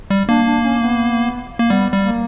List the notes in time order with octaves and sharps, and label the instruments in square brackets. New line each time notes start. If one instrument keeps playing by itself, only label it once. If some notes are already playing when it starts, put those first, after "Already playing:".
[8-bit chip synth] G3
[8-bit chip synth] A#3 [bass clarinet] D4
[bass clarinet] D4
C#4
B3
[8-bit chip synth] A#3
[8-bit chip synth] G3 [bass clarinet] B3
[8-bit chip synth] G3
[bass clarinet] A#3